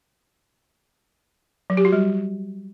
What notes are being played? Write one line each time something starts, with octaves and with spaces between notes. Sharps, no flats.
F#3
G4
F#4
G3